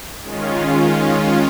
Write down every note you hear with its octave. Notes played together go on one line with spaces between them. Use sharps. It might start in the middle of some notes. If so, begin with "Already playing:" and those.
D#3 G#3 C#4 F4